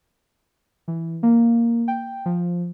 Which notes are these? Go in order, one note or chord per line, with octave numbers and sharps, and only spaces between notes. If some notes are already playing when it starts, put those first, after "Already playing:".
E3
A#3
G5
F3